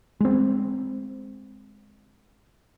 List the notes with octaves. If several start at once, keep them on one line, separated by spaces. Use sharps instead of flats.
G#3 C4